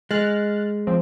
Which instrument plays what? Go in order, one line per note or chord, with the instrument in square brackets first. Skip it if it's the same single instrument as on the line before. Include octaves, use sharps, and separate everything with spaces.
[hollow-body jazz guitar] G#3 [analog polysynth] F6 F#6 A6
[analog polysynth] F3 C4